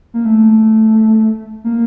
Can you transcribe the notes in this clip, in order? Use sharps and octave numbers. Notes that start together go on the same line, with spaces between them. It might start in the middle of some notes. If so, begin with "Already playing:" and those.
A#3
A3
A#3